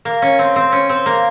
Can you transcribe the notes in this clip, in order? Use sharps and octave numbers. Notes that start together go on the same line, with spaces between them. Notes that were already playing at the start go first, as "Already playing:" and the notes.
A#3
C#4
C4
C4
C#4
C4
A#3